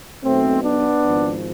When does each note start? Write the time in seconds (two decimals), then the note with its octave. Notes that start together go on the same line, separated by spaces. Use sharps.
0.23 B1 B2 A3 C4
0.63 B3 D4
1.01 G#1 G#2 F3